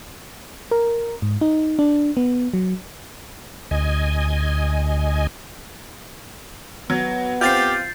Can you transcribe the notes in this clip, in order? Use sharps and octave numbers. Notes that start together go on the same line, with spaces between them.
A#4
G#2
D#4
D4
B3
F#3
D2 D#5 G#5
F#3 B3
C4 F4 G4 G6 A6 C7